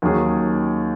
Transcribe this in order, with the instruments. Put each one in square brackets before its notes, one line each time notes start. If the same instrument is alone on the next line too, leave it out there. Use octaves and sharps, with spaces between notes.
[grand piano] D#2 D#3 F#3 C#4 G#4